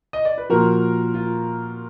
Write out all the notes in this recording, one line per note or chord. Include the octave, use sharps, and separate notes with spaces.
D#5
D5
B4
A#2 F3 F#4 A#4
F4